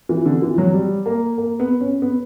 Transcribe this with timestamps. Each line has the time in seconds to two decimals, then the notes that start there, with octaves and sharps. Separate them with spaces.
0.09 E3
0.26 D3
0.42 E3
0.58 F#3
0.73 G3
1.06 A#3
1.38 A#3
1.60 B3
1.81 C#4
2.02 B3